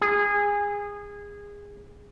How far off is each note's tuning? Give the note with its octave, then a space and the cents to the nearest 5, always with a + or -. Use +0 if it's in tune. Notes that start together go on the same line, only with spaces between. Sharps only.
G#4 -20